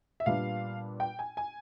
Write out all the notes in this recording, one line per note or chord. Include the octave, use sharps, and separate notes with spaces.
E5
A#2 G3 B3 D4 F5
G5
G#5
G#5